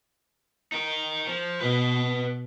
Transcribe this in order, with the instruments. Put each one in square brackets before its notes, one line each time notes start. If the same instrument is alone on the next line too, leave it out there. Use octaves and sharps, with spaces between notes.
[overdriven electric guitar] D#4 A#4
F3
[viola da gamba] B2 [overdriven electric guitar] B4 D#5